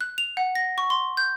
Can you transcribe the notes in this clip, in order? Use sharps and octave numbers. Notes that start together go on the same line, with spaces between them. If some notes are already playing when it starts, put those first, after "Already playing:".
F#6
F7
F#5
A#6
C#6
C6
G6